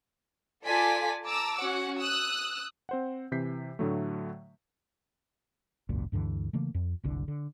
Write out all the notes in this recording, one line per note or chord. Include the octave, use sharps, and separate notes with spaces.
F4 A4 D5 G#5 B6
A5 A#5 D6 E6
C#4 F#4 F#5
D#6 E6 F#6
C4 C5 F#5
C3 E3 G6 B6 C7
A2 D3 F#3 A3
G#1 C#2 F#2 A#2
D2 G2 D3 E3
C#3 E3 A3 A#3
F2
F#1 C2 D3
D3